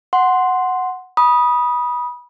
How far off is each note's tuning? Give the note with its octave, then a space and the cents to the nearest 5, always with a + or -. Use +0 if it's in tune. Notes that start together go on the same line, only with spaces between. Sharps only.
F#5 +0 C6 +0
B5 -25 D#6 +0